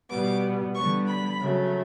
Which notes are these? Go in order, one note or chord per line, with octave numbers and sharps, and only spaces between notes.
B2 G3 B3 D6
D3 G3 B3 C#6
B5
C#3 F#3 A3